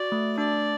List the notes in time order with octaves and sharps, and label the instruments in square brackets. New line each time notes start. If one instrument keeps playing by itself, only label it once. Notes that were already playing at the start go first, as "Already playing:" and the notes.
Already playing: [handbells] F#4 [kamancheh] D5
[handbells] A3
[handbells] D4 [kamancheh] D5